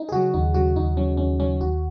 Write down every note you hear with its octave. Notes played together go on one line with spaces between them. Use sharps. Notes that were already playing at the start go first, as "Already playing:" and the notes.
Already playing: D#4
G#4
C#3 F#3 F#4
D#2 D#4
C#3 F#3 F#4
D#2 D#4
C#3 F#3 C#4
D#2 C#4
C#3 F#3 C#4
D#2 F#4